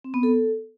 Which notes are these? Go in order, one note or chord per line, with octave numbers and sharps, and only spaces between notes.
C4
B3
A4